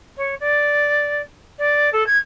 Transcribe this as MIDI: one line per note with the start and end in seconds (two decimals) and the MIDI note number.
0.17 0.34 73
0.40 1.21 74
1.58 1.89 74
1.92 2.06 69
2.06 2.17 92